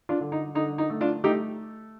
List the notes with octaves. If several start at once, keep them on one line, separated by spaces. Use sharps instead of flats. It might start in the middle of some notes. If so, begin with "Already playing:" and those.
D4 F4
D3
D#4
D3 D#4
D#4
A3
D4 F4
A3 D#4 G4